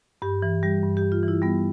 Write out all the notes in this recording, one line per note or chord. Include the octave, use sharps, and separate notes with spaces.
G2 G4
E3
G3 G4
G2
G4
G2
F4
E3
E4
G3 B3